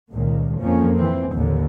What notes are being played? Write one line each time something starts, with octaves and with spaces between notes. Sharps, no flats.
C#2 A#2 D#3
F2 F3 A#3 C#4
E3 C4
A1 D#2 A2 D3